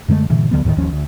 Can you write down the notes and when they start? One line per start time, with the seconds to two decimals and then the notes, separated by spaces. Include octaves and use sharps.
0.08 F#2 D3 G#3 A3
0.30 G2 A#2 D3 E3
0.51 D2 D3 F#3 B3
0.65 D#2 A2 C3 D#3
0.76 G1 D#2 F3 C#4
0.91 D2